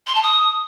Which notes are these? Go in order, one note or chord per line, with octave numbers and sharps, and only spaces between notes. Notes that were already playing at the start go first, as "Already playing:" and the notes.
C6
A5
D#6